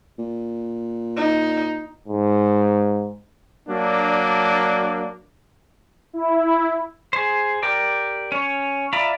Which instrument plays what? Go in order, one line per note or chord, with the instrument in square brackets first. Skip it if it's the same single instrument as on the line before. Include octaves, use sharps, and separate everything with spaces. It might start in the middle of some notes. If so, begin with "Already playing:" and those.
[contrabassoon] A#2
[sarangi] D#4
[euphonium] G#2
[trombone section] F#3 A#3 D4
[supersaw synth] E4
[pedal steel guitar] G#4 C5
G4 A#4 D5
C#4 C#5
F4 D5 E5 A#5 B5